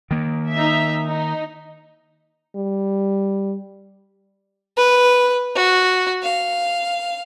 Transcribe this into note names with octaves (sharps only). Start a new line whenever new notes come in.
D#3 A#3
D#4 E5
D#4
G3
B4
F#4
F5